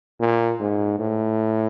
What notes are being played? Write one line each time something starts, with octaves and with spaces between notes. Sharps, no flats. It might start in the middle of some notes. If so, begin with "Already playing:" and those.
A#2
G#2
A2